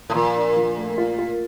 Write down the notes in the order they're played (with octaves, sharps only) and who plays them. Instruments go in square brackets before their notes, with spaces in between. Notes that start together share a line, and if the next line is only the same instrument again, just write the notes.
[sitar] A2
[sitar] A#2 [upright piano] F3
[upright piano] D4
F3
A3
F4
F4